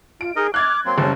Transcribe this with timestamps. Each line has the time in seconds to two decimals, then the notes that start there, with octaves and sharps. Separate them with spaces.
0.21 F4 D7
0.36 D#4 G#4 A#4 D#5
0.54 D6 F6 F#6 G#6 A6
0.85 F#3 A#3 C4 C6
0.98 F#1 G3 C#4 A4 A5